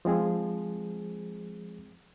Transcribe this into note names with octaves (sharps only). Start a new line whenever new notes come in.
F3 G#3 C4 G#4